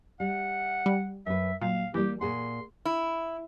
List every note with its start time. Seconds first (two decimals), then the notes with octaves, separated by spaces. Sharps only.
0.20 G3 F#5
0.86 G3
1.26 F#2 B4 E5
1.61 A#2 F#3 F5
1.94 E3 G3 A#3 G4
2.21 A#2 G#4 F#5 C6
2.85 E4